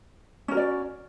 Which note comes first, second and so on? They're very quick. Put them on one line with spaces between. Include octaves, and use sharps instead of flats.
C#4 A#4 F#4 D5